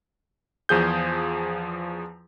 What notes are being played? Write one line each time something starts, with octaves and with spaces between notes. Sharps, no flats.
E2 F3 G#4 G6